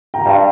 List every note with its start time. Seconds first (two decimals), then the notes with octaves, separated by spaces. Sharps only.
0.14 G5 A#5
0.25 G2 F5 A5